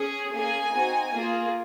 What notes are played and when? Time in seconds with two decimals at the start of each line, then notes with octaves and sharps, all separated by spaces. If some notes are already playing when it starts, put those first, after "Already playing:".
Already playing: C#4 G#4
0.33 A#3 C#4 G#4 G#5
0.74 C4 D#4 F#4
1.14 A#3 F4 G#4